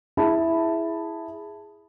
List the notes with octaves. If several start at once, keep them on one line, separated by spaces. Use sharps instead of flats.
E4 G#4 A5 B5